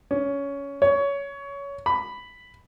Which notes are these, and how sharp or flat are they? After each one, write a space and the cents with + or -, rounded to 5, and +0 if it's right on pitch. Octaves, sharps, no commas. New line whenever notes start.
C#4 +15
C#5 +20
B5 +5